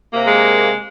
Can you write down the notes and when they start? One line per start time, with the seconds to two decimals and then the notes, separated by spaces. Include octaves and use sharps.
0.13 C3 A#3
0.27 G#3